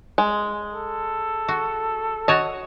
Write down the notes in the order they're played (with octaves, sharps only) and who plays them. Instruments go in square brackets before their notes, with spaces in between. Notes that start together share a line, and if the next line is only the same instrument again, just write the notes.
[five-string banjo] G#3
[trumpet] A4
[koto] F#4
[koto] F#4 C#5 A5 [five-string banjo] D#5